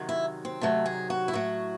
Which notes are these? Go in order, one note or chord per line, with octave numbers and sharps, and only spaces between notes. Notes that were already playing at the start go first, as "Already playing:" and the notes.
Already playing: C3 D#3 F#3
E4
C4
C3 D#3 F#3 A3
G#4
F#4
E4
A2 F#3 F#4